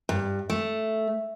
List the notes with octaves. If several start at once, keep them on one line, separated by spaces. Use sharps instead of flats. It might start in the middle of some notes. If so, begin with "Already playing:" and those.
G2
A3